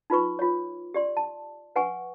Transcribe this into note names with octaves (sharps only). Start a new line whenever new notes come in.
D#4 F4 B4 C#6
F4 C#5
G4 D5 C6
A5
B4 F#5 G#5 C#6